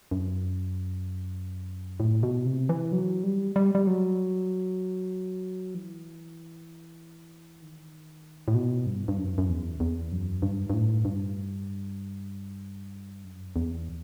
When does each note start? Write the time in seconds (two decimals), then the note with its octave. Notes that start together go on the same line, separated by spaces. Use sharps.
0.11 F#2
2.00 A2
2.23 B2
2.45 C3
2.69 E3
2.92 F#3
3.24 G3
3.56 G3
3.75 G3
3.87 F#3
5.75 E3
7.62 D#3
8.48 A2
8.55 B2
8.86 G2
9.08 G2
9.18 F#2
9.38 F#2
9.49 E2
9.80 E2
10.12 F#2
10.42 G2
10.70 G2
10.74 A2
11.05 G2
13.24 F#2
13.56 E2